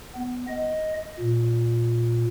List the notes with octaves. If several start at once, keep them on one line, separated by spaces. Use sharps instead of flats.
B3
D#5
A#2